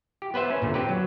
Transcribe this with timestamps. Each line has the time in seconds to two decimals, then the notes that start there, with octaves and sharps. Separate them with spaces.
0.22 G4
0.34 B3 B4 C5 E5
0.51 C#4
0.62 A#2 D3
0.74 C4 G4 B4
0.89 F#3